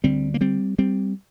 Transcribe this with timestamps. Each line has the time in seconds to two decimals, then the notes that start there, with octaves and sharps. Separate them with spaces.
0.04 D2 D3 G3 C4
0.34 A#3
0.41 G3 C4
0.79 G3 C4